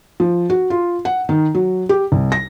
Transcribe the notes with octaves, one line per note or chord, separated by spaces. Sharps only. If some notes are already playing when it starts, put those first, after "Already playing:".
F3
F#4
F4
F#5
D#3
F#3
G4
C2
A#6